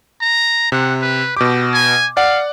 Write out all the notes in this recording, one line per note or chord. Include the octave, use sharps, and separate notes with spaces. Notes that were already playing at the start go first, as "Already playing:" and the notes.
A#5
C3 F#5
B4
B2 G4 D6
G#5
D5 F5 F#5